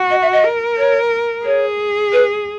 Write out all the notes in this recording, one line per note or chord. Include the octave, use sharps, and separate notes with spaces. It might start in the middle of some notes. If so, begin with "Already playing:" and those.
Already playing: F#4
D#5
E5
D#5
A#4
C#5
G#4 C#5
B4